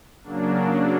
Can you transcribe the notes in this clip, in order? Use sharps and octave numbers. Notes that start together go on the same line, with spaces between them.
C#3 F#3 A#3 D4